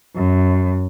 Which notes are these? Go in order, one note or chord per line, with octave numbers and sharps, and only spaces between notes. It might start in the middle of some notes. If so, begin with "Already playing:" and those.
F#2